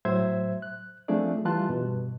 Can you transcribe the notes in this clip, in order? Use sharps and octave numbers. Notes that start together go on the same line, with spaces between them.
A2 F#3 C5 E5 G#6
F#6
F3 A3 C4 D4 G#4 D5
E3 G3 F4 A5 C6 F#6
G2 B2